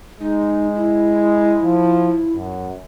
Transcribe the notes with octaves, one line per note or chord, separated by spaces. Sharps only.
G#3 D#4
E4
F3
F#2